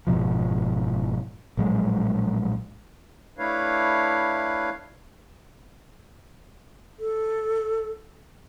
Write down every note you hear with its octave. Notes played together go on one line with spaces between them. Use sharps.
F#1 G#2 B2 F3
A#1 A2 F#3 G#3
A3 D4 E4 B4 C#5 F5
A4